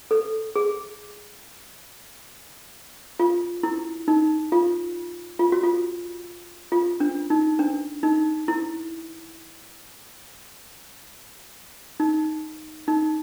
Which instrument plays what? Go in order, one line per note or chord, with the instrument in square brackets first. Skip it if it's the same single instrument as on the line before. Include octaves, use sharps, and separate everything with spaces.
[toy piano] A4
G#4
F4
E4
D#4
F4
F4
F#4
F4
F4
D4
D#4
D4
D#4
E4
D#4
D#4